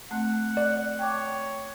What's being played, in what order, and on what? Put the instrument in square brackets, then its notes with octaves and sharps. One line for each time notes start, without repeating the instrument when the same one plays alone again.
[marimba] A3 C4 [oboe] F#5
[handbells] D5
[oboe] C#5 [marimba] G5 A5 D6